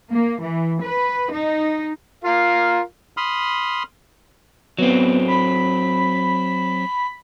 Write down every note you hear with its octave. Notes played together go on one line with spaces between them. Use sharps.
A#3
E3
B4
D#4
F4 A#4 F5
B5 C6 D#6 F6
F#3 B3 C4
B5